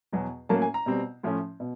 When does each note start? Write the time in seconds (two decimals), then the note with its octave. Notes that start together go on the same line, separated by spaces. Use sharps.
0.13 E2 B2 F#3
0.49 A2 F#3 A#3 C#4 A5
0.62 G#5
0.74 A#5
0.86 B2 G3 C4
1.23 A2 F3 A3 C#4
1.60 B2